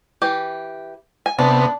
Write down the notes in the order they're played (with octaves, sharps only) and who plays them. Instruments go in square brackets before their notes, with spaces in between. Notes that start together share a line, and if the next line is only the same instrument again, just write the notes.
[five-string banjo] E3 G4
G#5
[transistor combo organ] C3 B3 [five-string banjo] D4